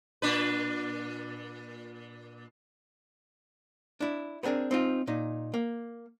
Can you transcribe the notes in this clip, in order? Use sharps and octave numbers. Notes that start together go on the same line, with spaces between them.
A#2 D4 B4
D4 E4
B3 C4 D4 G#4 A#4
C4 D#4 F4
A#2 D#4
A#3